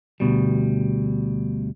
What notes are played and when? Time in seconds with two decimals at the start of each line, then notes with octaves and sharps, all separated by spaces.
0.20 D2 B2 G3